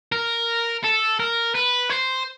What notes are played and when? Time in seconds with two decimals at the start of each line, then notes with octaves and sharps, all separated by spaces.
0.12 A#4
0.84 A4
1.19 A#4
1.55 B4
1.90 C5